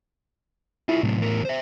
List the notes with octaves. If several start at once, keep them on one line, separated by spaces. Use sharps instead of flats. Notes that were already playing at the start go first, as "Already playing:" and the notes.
E4 F4 G#4
A2 C3 F#3
E2 A#4
C5 E5